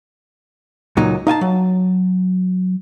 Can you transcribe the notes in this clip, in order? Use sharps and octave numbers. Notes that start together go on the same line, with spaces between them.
C#2 A#2 F#3 D#4
D#4 F5 G#5 A5
F#3